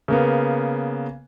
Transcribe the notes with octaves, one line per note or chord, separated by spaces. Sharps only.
C#3 A#3 B3